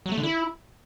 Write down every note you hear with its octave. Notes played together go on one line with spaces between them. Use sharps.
F#3
A3
D3
E4